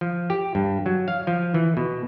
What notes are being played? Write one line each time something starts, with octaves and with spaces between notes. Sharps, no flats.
F3
G4
G2
F#3
F5
F3
E3
B2